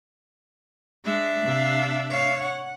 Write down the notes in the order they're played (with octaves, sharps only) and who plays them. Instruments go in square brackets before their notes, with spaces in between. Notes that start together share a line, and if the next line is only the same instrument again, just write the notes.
[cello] G#3 [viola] D4 E5
[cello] C3 F5
C#5 F5
F#5